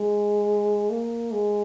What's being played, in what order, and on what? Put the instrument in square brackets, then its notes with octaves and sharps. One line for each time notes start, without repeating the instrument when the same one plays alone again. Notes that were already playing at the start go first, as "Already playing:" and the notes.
Already playing: [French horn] G#3
A#3
G#3